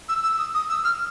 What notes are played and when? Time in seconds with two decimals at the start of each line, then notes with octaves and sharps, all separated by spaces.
0.09 E6
0.23 E6
0.38 D#6
0.54 D#6
0.69 E6
0.84 F6